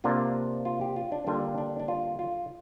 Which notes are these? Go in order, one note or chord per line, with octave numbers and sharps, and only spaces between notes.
C3 A#3 D4 F4
F4
G4
F4
D4
D3 G3 A#3 D4 F4
D4
D4
F4
F4